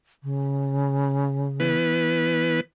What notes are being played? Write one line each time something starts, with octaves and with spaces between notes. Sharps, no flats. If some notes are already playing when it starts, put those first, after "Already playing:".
C#3
E3 B3 B4